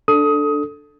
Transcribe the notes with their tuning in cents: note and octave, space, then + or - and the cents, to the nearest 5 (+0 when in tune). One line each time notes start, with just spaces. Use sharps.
D4 +0 A4 +0 D#6 +20